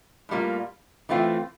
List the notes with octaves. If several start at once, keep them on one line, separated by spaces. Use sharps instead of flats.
A2 G3 A#3 F4
E3 A3 C4 F4